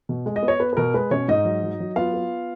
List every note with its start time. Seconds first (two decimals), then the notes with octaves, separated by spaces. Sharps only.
0.09 B2
0.26 G#3
0.36 D#5
0.43 B3
0.48 C#5
0.60 B3 B4
0.73 B4
0.77 B2 A#4
0.94 G#3 B4
1.11 B2 C#4 C#5
1.28 G#2 D#4 D#5
1.45 F#3
1.63 F#3
1.80 F#3
1.96 B3 F4 F5
2.14 B3